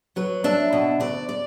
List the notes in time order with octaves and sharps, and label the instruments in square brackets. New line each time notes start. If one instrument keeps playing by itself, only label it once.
[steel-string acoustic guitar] F#3 B4
D4 E5
B2
D2 D5
D5